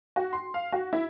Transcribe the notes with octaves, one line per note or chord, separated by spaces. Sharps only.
F#4
C6
F5
F#4
E4